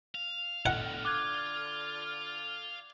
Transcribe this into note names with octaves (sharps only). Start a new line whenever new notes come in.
F5
B2 D3 A3 F#5 F6
F4 D6 F#6 G#6